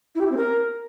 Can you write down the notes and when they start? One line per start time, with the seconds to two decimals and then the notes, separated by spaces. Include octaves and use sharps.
0.14 E4
0.20 G4
0.25 E4
0.31 C4
0.36 A#4